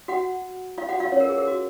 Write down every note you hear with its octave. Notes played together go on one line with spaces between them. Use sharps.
F#4 F#5
F4 F5
F#4 F#5
F4 F5
C#4 C#5
A#4
G#4
A#4
F#4